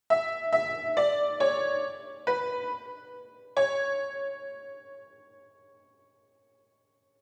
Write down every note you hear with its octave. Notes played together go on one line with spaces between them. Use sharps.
E5
E5
D5
C#5
B4
C#5